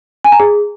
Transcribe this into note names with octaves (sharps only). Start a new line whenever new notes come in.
G#5
A#5
G#4